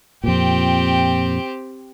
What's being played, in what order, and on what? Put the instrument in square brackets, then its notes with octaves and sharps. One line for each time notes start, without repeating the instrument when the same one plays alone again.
[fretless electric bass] F2 A#2 [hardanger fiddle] C4 G4